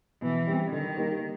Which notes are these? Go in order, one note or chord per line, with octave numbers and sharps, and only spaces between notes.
B2 E3
G3 C4
D3 D#3
G3 A#3 D#4 G4